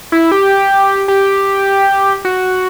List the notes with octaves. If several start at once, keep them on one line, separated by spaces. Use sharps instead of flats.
E4
G4
G4
F#4